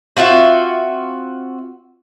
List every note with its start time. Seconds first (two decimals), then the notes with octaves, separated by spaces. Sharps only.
0.17 C4 F4 F#4 E5